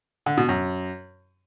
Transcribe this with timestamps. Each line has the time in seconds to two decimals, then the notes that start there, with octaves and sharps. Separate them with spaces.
0.26 D3
0.37 B2
0.49 F#2